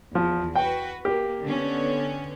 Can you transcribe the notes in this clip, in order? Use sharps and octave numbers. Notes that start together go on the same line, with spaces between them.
E2 F3
F#4 B4 G5
A#3 G4
D3 B3 C#4